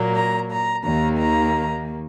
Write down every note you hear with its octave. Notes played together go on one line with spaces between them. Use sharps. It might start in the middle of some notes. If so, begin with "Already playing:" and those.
Already playing: A#2 F#3 A#3
A#5
A#5
D#2 D#3 A#3 A#5
A#5